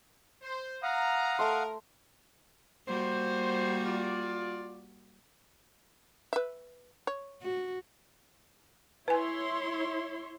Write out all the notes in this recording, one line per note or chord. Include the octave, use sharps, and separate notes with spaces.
C5
F5 F#5 A#5 D#6
A3 A#4 C6
G3 A#3 F#4 C5
F4 D5
B4 E5
C#5
F#4
E4 B4 C#5 G#5 C6